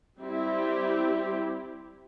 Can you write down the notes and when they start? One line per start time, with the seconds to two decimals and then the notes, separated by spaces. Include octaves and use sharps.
0.19 G3 C4 E4 G4